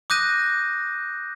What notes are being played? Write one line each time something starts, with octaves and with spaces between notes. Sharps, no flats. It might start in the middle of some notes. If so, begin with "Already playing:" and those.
D6 D#6 F#6 G6 A#6 D#7